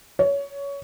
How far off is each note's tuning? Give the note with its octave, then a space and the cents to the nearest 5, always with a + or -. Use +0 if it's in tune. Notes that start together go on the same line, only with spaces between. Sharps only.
C#5 +20